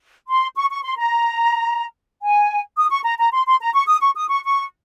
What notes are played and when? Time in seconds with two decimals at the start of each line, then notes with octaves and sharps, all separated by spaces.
0.28 C6
0.56 C#6
0.70 C#6
0.84 C6
0.97 A#5
2.22 G#5
2.77 D#6
2.91 C#6
3.04 A#5
3.19 A#5
3.33 C6
3.47 C6
3.60 A#5
3.74 C#6
3.87 D#6
4.01 C#6
4.16 D#6
4.30 C#6
4.44 C#6